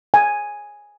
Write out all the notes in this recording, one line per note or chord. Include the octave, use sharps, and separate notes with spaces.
G#5